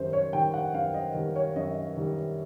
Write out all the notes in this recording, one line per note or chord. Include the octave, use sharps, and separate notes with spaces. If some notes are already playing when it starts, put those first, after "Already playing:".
Already playing: F#2 D#3 G3 C5
C#5
D#3 G3 G5
F#5
F#2 F5
D#5
D#3 G3
C#5
F#2 D#5
D#3 G3